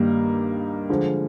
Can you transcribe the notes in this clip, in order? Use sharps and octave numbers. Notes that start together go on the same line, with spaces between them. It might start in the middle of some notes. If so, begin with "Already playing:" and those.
Already playing: G2 D#3 G3 A#3
D3 F3 G#3